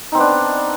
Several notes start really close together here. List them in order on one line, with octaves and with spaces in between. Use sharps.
D#4 C4 B3 D4